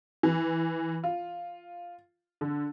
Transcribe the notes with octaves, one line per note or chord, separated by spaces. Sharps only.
E3
F4
D3